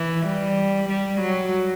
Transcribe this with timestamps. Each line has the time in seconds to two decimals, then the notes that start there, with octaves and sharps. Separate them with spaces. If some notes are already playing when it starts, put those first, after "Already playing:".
Already playing: E3
0.26 G3
0.89 G3
1.21 F#3